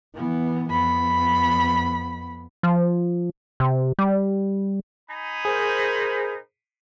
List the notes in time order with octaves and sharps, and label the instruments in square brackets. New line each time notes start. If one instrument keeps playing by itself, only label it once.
[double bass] E3 B3
[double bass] F2 B3 [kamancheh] B5
[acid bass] F3
C3
G3
[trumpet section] D#4 G#5 B5
[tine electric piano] G#4 [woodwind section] A#4 C5